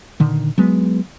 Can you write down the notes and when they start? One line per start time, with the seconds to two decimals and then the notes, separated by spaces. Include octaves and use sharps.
0.20 A#2 D3 D#3
0.58 F#3 G#3 B3